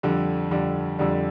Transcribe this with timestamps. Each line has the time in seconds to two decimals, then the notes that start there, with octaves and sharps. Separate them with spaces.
0.03 F2 D3 G3
0.51 F2 D3 G3
0.99 F2 D3 G3